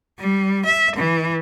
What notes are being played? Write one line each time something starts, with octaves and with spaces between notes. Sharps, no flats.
G3
E5
E3